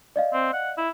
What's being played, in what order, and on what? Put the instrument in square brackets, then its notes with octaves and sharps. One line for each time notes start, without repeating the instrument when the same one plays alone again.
[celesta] D5 D#5 F5
[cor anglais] C4
F#5
E4